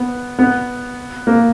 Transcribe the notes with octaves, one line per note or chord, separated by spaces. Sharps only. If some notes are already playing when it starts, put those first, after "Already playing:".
Already playing: B3
B3
A#3